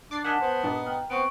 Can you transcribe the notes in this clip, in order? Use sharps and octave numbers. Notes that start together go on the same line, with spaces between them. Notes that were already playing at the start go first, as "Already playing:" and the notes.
D4 D6 A6 C7
D#3 D4 F#5 G#5 A5 B6 E7
B3 C5
G2 A#2 D4 D#4
G5 A#5 F6
B3 C4 C#6 D7